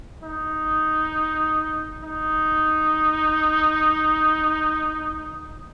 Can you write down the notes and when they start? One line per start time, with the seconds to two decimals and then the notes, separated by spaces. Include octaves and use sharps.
0.23 D#4
2.04 D#4